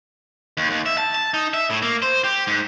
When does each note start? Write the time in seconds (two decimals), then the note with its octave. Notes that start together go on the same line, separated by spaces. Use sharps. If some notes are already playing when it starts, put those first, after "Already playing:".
0.57 D#2
0.70 D#2
0.86 E5
0.98 A5
1.15 A5
1.34 D#4
1.54 E5
1.70 A2
1.82 A#3
2.02 C5
2.24 G4
2.47 G#2